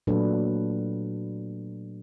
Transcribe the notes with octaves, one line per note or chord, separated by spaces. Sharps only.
A#2 F#3 A3 D4 A4 B4